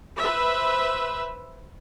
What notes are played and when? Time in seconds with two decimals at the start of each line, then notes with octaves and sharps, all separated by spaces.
0.18 B4 C5 E5